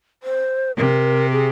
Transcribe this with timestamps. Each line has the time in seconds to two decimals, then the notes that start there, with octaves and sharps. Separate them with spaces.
0.23 C5
0.77 C3 A#4
1.32 G#4